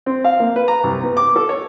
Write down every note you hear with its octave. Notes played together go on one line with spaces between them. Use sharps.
C4
F5
A#3
B4
A#5
C2
B3
D6
A4
C#5